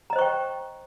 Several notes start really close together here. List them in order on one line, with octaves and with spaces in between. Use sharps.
A#5 D#5 C5 C#6 G5